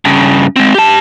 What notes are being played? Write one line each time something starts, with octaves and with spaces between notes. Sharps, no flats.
G2 C#3
G#3 C4
G4 A5